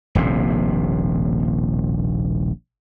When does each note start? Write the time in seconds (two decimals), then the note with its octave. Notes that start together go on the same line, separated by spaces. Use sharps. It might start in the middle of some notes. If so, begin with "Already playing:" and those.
0.15 D#1 A#1 A2 C3